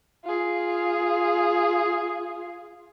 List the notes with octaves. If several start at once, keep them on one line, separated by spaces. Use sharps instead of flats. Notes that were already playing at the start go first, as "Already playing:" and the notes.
F4 G#4